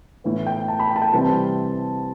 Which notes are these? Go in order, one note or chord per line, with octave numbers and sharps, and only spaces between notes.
A2 E3 B3
G5
A5
B5
G5
A5
G5
C3 E3 G3 C4 A5